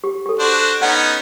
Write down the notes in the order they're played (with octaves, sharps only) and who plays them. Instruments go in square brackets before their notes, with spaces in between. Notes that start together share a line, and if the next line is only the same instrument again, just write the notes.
[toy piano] G4
G4 A4
[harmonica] D4 F#4 C5
[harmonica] B3 C#4 D#4 [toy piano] F#5